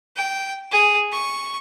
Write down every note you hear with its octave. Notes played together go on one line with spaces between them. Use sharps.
G5
G#4
C#6